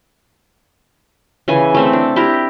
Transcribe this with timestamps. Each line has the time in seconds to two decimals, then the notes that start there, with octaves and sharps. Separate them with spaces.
1.48 C#3 E3 G#5
1.75 A3 C4 E5
1.93 D4
2.16 E4 G4 A#4